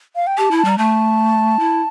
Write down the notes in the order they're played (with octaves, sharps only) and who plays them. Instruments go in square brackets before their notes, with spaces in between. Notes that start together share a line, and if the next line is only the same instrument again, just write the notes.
[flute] F5
G5
[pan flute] G4 [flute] A5
[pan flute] E4
[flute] A5
[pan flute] G3 [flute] A#5
[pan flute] A3 [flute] A5
[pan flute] E4